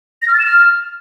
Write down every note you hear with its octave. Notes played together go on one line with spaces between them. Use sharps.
A#6
F6
A6
E7
F6